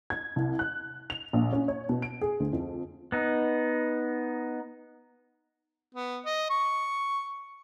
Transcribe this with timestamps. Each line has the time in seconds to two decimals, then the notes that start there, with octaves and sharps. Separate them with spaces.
0.10 G#6
0.36 C2
0.59 F#6
1.10 F7
1.33 A#1
1.52 C#4
1.68 C#5
1.89 B2
2.02 D7
2.21 G#4
2.40 D2
2.53 F2
3.12 B3 D#4
5.95 B3
6.26 D#5
6.50 C#6